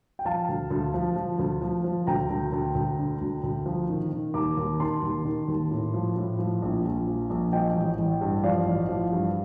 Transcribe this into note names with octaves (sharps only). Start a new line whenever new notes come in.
G5
F3 F5 A5
D2
D2
F3
F3
D2
F3
F3
D2 G5 A#5
D2
D2
D2
D3
D2
D2
F3
D#3
D#3
D#2 A#5 D6
D#2
D#3 A5 C6
D#2
D#3
D#2
A2
F3
A2
F3
A#1
A#1
F3
A#1
F3 D#5 G5
A1
A1
G2
F3 D5 F5
A1
F3
G2